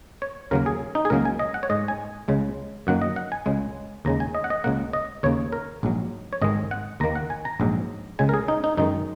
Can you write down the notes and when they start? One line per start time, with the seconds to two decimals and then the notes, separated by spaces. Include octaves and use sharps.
0.22 C#5
0.51 D#2 C#3 F#3 A#3 A#4
0.66 G#4
0.95 D#4
1.05 G#4
1.10 C#2 C#3 F#3 A#3 A#4
1.25 G#5
1.39 D#5
1.54 F#5
1.63 C#5
1.70 G#2 G#3 D#5
1.88 G#5
2.28 C#2 C#3 G#3
2.87 F#2 D#3 F#3 A#3 F#5
3.02 D#5
3.16 F#5
3.32 G#5
3.46 C#2 C#3 G#3
4.05 D#2 C#3 G#3 A#5
4.20 G#5
4.35 D#5
4.44 F#5
4.50 D#5
4.64 C#2 C#3 A#3 F#5
4.93 D#5
5.23 D#2 C#3 A#3 C#5
5.52 A#4
5.83 A#1 G#2 F#3
6.33 C#5
6.42 G#1 G#2 D#3 G#3 D#5
6.71 F#5
7.00 D#2 D#3 A#3 A#5
7.15 F#5
7.30 G#5
7.45 A#5
7.60 A#1 G#2 F#3
8.19 C#2 C#3 G#3 G#5
8.29 A#4
8.34 G#4
8.48 D#4
8.64 D#4
8.77 F#2 D#3 G#3 D#4